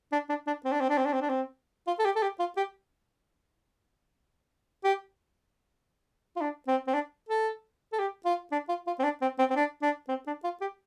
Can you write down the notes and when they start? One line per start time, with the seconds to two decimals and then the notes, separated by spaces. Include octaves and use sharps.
0.12 D4
0.29 D4
0.47 D4
0.65 C4
0.72 D4
0.81 C4
0.89 D4
0.98 C4
1.06 D4
1.13 C4
1.21 D4
1.30 C4
1.87 F4
1.99 A4
2.05 G4
2.16 A4
2.22 G4
2.39 F4
2.57 G4
4.84 G4
6.36 F4
6.41 D4
6.68 C4
6.87 C4
6.94 D4
7.29 A4
7.93 A4
7.99 G4
8.26 F4
8.52 D4
8.69 F4
8.87 F4
8.99 C4
9.04 D4
9.22 C4
9.39 C4
9.50 C4
9.56 D4
9.82 D4
10.09 C4
10.27 D4
10.44 F4
10.61 G4